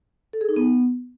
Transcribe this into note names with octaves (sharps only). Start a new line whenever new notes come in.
A4
G#4
D#4
B3